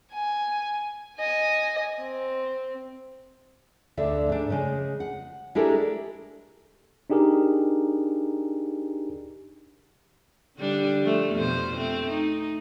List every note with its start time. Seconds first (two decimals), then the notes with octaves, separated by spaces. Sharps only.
0.13 G#5
1.17 D#5 G#5
2.00 C4
3.97 D2 D3 D4 E5
4.29 G#2 D4
4.50 C#3 G#3
5.00 F#5
5.55 G#3 D4 E4 G4 A4 A#4
7.10 D4 D#4 G4 G#4 A#4
10.57 D3 G3 D4
11.03 F3 A3
11.33 F2 B2 C5
11.77 A3 C4
12.10 D#4